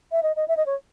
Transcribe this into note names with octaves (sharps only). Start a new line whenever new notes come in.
E5
D#5
D#5
E5
D#5
C#5